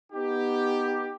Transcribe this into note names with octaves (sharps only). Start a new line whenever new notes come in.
B3 D#4 G4